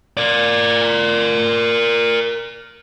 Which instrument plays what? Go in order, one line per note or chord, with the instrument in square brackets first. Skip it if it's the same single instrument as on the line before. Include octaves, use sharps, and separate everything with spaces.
[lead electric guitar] A#4 D5